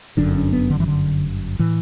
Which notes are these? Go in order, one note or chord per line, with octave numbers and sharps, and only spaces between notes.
G1 F#2 D3 D4
C#4
B3
D3
E3
D3
A2 E3